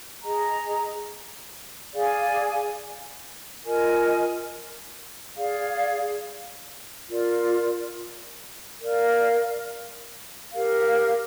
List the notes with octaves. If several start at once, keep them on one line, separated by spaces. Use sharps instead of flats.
G#4 D#5 A#5
G#4 D5 F5 G#5
F4 A#4 D#5 G#5
G#4 D5 F5
F4 A#4 D5
A#4 D5 F5
G4 A#4 F5